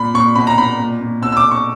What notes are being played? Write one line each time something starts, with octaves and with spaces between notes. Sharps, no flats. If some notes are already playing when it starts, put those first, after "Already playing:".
Already playing: A#2 B5
A#2 C#6
B2 B5
A#5
B2 B5
A#2
A#2
B2 E6
E6
D6
B2
C#6